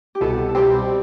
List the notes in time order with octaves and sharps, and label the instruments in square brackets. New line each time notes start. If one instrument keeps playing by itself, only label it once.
[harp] G4
[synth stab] C2 B2 B3 [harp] A4
[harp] A4
[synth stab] C2 B2 G3 C4 [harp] G4